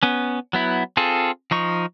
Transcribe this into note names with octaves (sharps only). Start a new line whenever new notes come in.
B3 C#4
F#3 B3 E4
C4 F4 G#4 A4
F3 D#4 C#6